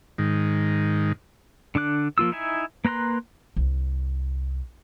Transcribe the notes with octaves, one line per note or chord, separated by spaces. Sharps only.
G#2 D#3
D3 D4 D6 F#6
F3 A#3 F4 E6
D#4 E4 E5 G#5
A#3 B4 A#5 C6 F#6
C2